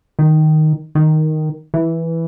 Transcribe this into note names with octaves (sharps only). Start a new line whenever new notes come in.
D#3
D#3
E3